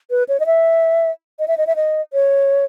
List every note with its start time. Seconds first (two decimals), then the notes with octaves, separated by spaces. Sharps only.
0.11 B4
0.29 C#5
0.40 D#5
0.46 E5
1.39 D#5
1.48 E5
1.58 D#5
1.67 E5
1.76 D#5
2.13 C#5